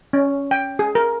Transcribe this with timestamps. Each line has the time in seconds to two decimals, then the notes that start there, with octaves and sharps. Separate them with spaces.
0.13 C#4
0.51 G5
0.79 G#4
0.95 A#4